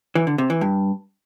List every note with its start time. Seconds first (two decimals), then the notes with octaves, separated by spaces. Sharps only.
0.15 E3
0.27 D3
0.38 C3
0.50 E3
0.61 G2